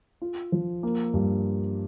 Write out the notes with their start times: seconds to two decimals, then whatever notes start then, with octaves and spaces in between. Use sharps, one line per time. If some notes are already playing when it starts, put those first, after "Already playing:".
0.22 F4
0.52 F3
0.83 A#3
1.14 G2